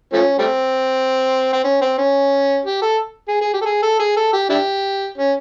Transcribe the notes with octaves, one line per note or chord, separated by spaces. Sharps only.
F3 A3 C#4
G3 A3 C4
C4
C#4
C4
C#4
G4
A4
G#4
G#4
G4
A4
G#4
A4
G#4
A4
G4
D4 E4 G4
C#4